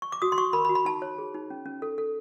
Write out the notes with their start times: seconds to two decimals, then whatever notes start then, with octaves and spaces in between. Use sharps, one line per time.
0.02 C#6
0.12 D6
0.22 F#4 D#6
0.32 C6
0.37 F#4 C#6
0.53 A#4 B5
0.65 B5
0.69 F#4
0.75 B5
0.85 D#4 A5
1.02 C#5
1.18 G#4
1.34 D#4
1.50 C#4
1.66 C#4
1.82 A4
1.98 A4